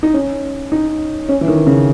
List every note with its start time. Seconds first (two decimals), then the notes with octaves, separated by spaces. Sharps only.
0.03 D#4
0.14 C#4
0.72 D#4
1.29 C#4
1.41 E3
1.48 D#3
1.67 C#3